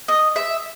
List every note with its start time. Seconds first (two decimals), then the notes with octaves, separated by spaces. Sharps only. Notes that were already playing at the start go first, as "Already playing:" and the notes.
0.08 D#5
0.36 E5